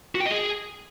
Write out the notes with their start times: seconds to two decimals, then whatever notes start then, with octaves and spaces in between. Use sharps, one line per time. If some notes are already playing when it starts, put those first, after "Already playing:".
0.15 F#4
0.20 G5
0.26 D#5
0.31 G#4